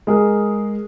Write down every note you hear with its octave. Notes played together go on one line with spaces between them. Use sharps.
G#3 G#4 A#4